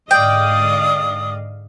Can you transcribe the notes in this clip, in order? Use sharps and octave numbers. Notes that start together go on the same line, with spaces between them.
G#2 D3 D5 D#5 F5 G5 D#6